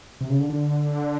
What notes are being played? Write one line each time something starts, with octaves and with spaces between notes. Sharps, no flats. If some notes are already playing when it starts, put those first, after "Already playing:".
C3
C#3
D3
D3